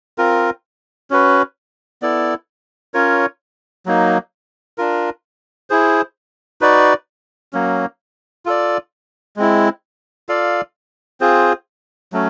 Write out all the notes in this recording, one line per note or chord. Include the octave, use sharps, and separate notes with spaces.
C4 F4 A#4
C#4 F#4 B4
B3 E4 A4 D5
C#4 F4 A#4 C#5
F#3 A#3 D#4
D4 F4 A#4
E4 G#4 C5
D#4 F#4 B4 D5
F#3 A#3 C#4
F4 A4 D5
G#3 C4 E4
F4 A4 D5 F5
C4 F4 G#4 C5
F#3 A3 C#4